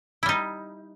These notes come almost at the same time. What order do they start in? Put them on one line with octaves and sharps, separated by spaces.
E4 G3 D#4